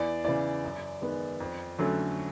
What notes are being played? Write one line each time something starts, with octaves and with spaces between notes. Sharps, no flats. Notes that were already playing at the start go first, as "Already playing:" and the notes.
Already playing: E2 D5
C#3 E3 D5
F#2
D#3 G#3 B3
F2
D3 F#3 A3 C#4